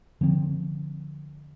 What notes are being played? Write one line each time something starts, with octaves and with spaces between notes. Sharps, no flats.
D3 F3 C4